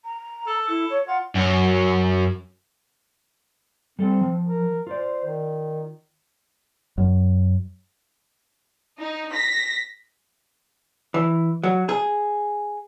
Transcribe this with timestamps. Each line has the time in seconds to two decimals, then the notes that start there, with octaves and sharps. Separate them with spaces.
0.04 A#5
0.47 A4
0.68 E4 A4
0.90 C#5
1.07 F4 F#5
1.35 F#2 F#3
3.99 G3 C4 A4
4.21 F3
4.45 A#4
4.87 F4 C5 D5
5.25 D#3
6.98 F#2
8.99 D#4
9.32 A#6 B6
11.14 E3
11.63 F#3
11.89 G#4